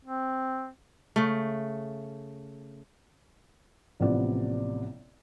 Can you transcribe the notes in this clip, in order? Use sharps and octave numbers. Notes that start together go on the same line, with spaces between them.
C4
C#3 A3
A1 C3 F3 B3 D5